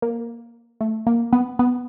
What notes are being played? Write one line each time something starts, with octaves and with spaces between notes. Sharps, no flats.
A#3
A3
A#3
B3
B3